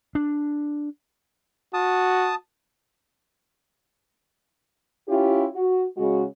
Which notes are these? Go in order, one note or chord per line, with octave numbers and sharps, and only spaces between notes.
D4
F#4 A5 D#6
C#4 E4 F4 G4
F#4
C#3 G#3 F#4